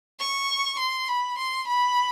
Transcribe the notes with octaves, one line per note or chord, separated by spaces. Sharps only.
C#6
C6
B5
C6
B5